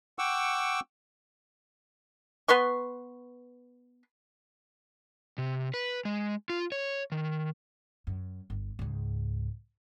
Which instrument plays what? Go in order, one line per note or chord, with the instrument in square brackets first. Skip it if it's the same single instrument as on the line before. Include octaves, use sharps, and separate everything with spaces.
[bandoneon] F#5 G5 C#6 D6 E6
[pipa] B3 B4 C6 C#6
[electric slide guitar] C3
B4
G#3
F4
C#5
D#3
[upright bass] F#2
G1
C#2 G#2